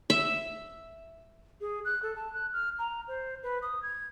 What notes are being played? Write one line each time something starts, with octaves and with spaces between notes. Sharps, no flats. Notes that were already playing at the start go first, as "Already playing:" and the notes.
E5
G#4
F#6
A4
A5
F#6
F6
A#5
C5
B4
D#6
G#6